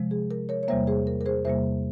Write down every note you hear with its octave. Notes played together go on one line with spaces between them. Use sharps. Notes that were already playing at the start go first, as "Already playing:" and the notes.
Already playing: C3 F3 G#3
G#4
A#4
A#4 C#5
C#5
E2 C3 G3 A#3 C5 E5
G#4 C5
A#4
A#4
G#4 C5
E2 C3 G3 A#3 C5 E5